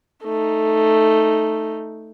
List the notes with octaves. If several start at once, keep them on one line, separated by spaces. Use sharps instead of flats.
A3 D#4